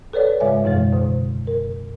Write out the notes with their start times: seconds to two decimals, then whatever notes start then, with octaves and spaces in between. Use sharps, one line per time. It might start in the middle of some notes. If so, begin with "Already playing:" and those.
0.13 A4 B4 C#5 D5
0.40 G#2 C#3 G#3 C#5 E5 G#5
0.64 F#2 B2 E3 G#3
0.92 B2 D3
1.47 A#4